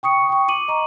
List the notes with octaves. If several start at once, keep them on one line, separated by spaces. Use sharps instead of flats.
G5 C#6 D#6 C#7
G5 C#6
D6 D#7 F#7
D#5 A#5 C#6 D6